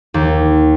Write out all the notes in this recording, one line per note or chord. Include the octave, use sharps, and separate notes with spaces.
D#2